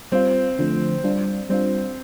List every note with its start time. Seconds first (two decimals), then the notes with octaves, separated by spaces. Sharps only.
0.12 G3 C4 F4
0.59 D3 F3 A3
1.04 G3 D4 F4
1.49 G3 C4 D4 F4